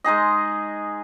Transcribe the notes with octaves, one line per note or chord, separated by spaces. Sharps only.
G#3 D#4 G#4 D#5